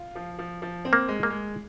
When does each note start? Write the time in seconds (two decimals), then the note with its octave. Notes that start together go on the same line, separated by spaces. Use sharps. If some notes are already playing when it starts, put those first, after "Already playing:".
Already playing: F4
0.15 F3
0.39 F3
0.62 F3
0.85 C4
0.93 A#3
1.08 G#3
1.23 A#3
1.30 G#3